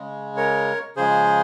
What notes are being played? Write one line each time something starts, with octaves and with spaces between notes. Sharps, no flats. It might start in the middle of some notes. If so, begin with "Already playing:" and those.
Already playing: C#3 G#3
A#4 C#5
C#3 F3 G#3 G#4 C5